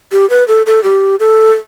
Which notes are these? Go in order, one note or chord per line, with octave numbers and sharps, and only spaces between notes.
G4
B4
A4
A4
G4
A4